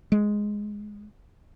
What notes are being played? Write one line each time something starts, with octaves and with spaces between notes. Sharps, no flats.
G#3